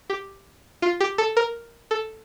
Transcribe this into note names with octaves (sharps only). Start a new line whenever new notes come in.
G4
F4
G4
A4
A#4
A4